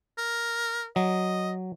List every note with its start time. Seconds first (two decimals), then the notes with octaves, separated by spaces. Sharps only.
0.18 A#4
0.96 F#3 D#5